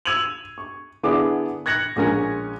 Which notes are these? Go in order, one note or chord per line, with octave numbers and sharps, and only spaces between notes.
E6 G#6 D#7 F7 F#7
C#6
D3 B3 E4 G#4 D5 D6
F#6 G#6 A#6 C#7 F#7
A#1 G#3 C#4 A#4 G#5 A#6